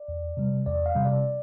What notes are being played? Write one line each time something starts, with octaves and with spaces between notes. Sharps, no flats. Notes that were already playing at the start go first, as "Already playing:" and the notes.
Already playing: D5
E2
C3 G3
E2 D5
F5
C3 G3
D5